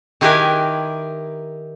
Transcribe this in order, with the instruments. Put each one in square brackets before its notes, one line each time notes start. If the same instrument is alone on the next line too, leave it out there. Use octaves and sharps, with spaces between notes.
[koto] D#3 E4 G4 A#4 B4 G#5